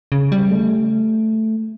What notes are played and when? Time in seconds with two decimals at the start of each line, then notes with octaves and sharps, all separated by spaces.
0.12 C#3
0.32 G3
0.51 A3